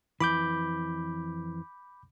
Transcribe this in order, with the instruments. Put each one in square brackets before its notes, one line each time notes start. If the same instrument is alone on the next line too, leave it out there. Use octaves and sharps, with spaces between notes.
[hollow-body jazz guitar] F2 E3 [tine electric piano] B5 D6 G6